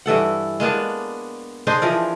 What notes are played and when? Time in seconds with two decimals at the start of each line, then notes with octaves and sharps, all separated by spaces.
0.06 G2 E3 A4 F#5
0.60 G#3 A#3 B3 D4
1.67 D4 D#4 G#4 C5
1.82 E3 F3 A#4